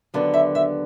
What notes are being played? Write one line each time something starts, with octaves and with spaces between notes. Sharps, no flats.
D#2 D3 F#3 B3
E5
E5